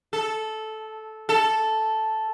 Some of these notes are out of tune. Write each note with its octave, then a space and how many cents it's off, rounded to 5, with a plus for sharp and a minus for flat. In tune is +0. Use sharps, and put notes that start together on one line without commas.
A4 -10
A4 -5